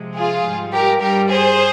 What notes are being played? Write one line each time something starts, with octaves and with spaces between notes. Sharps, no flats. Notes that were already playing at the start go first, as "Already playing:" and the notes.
Already playing: C3 F3 G#3
F4 G#4
G#2 G3
G4 A#4
G2 G3 G4 A#4
G#4 C5